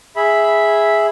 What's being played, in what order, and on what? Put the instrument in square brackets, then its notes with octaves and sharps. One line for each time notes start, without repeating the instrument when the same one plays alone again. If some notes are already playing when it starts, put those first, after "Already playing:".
[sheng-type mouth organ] G#4 E5 B5